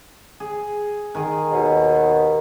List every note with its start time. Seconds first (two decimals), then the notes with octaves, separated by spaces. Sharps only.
0.40 G#4
1.15 D#3 G#4
1.52 D#2 B2